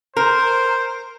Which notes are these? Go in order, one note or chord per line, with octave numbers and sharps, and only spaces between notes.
A#4 C5